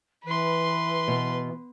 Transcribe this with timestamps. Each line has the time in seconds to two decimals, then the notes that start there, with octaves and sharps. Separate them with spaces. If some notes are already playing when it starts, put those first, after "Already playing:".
0.25 E3 B4 C6
1.08 B2